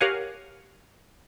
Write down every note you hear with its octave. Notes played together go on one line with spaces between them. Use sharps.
G4 A#4 C#5 F5 F#5 G#5